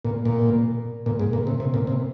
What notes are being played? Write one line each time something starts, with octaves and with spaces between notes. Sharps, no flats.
A#2
A#2
A#2
G#2
A#2
C3
C3
A#2
C3